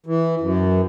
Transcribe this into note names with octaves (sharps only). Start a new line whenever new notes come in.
E3
F#2